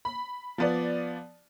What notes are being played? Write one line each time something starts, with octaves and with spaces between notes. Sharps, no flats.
B5
F3 B3 D5